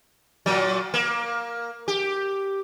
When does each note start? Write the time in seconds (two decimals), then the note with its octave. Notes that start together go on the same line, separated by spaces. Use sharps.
0.46 A#2 F#3
0.94 A#3
1.88 G4